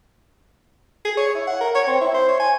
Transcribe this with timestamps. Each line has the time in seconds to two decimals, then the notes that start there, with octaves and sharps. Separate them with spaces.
1.05 G#4
1.17 C#5
1.35 E4
1.47 F#5
1.61 A#4
1.75 C#5
1.87 C4
2.01 E4
2.14 C5
2.28 C#5
2.40 G#5